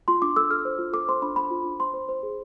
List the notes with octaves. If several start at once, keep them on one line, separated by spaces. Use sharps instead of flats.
F4 C6
D4 D6
A4 E6
A4 F6
C5
F4
A4 D6
C5 C6
D4 B5
A4 B5
F4
D4
C5 C6
C5
C5
G#4